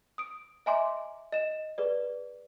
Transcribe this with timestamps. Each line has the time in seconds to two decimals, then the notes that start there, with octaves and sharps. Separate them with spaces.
0.18 D#6 D7
0.66 D#5 E5 G#5 A#5 C6 D6
1.32 D#5 E7
1.78 G#4 B4 D5